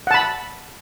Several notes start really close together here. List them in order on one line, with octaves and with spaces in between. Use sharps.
F#5 A5 B5